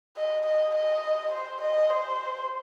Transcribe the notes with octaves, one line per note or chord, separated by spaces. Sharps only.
D#5
D#5
D#5
C5
D#5
C5